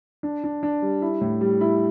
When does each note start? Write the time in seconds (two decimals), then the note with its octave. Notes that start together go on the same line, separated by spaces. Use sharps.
0.23 D4
0.44 D4
0.63 D4
0.82 G3
1.02 E4
1.21 A2
1.41 G3
1.61 E4